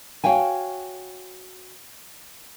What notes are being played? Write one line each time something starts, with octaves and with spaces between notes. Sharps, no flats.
F#4 C#5 F5 G5 G#5